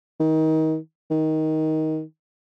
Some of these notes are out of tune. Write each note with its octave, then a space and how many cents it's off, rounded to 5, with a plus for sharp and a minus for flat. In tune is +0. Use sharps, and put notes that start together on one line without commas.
D#3 +25
D#3 +15